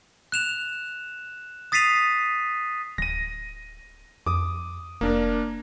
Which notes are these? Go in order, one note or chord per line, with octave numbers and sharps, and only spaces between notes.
F#6 E7 F7
D#6 A6 B6 C7 D#7 F7
D1 A#6 D#7
F2 D6 D#6
F1 A#3 D4 A#4